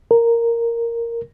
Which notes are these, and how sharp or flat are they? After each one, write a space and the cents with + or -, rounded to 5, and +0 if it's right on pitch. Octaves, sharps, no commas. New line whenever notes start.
A#4 -5